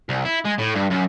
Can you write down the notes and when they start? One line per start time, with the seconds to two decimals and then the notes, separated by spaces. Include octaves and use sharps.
0.09 C2
0.25 E4
0.45 G#3
0.58 A2
0.75 G2
0.90 F#2